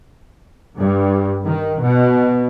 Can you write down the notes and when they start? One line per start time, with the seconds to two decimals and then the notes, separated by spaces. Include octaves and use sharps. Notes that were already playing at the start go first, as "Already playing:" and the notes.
0.79 G2
1.45 D#3
1.82 B2